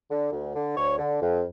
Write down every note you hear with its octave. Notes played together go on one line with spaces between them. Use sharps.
D3
D2
D3
D2 C#5
D3
F2